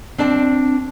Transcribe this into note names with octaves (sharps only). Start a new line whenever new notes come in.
C4 D4 D5 A5